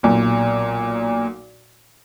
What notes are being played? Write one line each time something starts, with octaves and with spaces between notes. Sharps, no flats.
B1 A#2